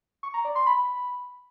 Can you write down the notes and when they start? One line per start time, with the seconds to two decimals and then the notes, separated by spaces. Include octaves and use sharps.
0.23 C#6
0.34 A#5
0.45 D5
0.55 C6
0.66 B5